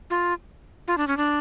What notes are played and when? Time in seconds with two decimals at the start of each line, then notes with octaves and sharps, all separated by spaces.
0.10 F4
0.88 F4
0.98 D4
1.07 C#4
1.17 D4